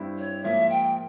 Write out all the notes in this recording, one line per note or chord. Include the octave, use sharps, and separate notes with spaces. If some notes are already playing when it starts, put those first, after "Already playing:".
Already playing: G2 G3 C4 E4
C#5
G#2 F3 A#3 E5
G5